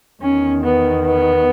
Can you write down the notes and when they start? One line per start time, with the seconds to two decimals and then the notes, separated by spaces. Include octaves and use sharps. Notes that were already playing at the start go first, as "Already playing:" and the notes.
0.23 E2 D#3 C#4
0.63 B3
1.05 B3